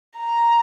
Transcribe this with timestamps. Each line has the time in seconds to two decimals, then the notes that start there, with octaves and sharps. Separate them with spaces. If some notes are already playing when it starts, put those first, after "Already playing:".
0.18 A#5